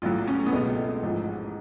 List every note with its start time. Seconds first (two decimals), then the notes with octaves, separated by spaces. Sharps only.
0.02 A1 A2 F#3 F4
0.28 C#4
0.46 B3
0.53 C#2 B2 G#3 A3
1.03 A1 G#2 F3